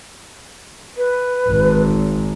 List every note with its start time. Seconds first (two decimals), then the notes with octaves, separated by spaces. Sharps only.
0.97 B4
1.49 G#1